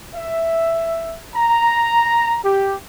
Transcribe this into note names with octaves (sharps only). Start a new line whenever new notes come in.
E5
A#5
G4